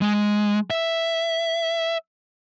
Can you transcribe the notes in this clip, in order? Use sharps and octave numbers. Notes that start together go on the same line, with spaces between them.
G#3
E5